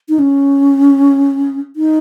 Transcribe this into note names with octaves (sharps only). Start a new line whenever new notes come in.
D#4
C#4
D#4